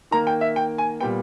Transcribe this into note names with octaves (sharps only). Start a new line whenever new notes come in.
D#3 A#3 A#5
G5
E5
G5
G#5
A#2 G3 B3 G5